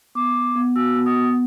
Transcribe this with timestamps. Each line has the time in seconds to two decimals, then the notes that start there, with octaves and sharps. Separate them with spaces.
0.15 B3 D6
0.35 B3
0.55 B3
0.76 F#4 E6
0.96 B3
1.06 D#6
1.17 B3